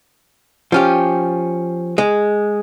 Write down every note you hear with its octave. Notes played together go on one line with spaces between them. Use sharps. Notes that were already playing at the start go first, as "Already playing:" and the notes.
F3 C#4 G4
G#3